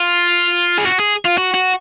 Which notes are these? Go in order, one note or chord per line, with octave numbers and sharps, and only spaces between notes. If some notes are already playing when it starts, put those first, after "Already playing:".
Already playing: F4
G#4
F#4
G#4
F4
F#4
F#4